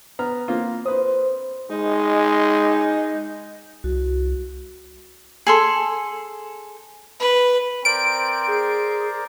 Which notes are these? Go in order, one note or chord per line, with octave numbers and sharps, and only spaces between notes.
B3 A#5 F6
A#3 C4 F4
B4 C5 D#6
G#3 D#4
C2 F#4
G#4 A4 C6
B4
C4 A#4 C5 D5 D7
G#4